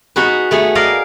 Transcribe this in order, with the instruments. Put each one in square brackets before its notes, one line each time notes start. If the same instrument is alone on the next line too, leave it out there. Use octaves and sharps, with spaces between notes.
[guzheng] B3 D#4 F#4 G#4 B4
A3 B3 G#4
A#4 D5 D#5 F5 G#5